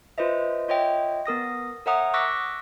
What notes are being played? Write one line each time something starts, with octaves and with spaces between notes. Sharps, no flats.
F4 B4 C5 D#5 E5
F4 C#5 D#5 E5 G5
B3 A#4 D#6 A#6
A#4 C#5 E5 F#5 A#5 D#6
C#6 D6 E6 F#6 A#6 B6